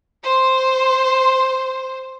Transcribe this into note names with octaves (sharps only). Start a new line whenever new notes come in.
C5 C6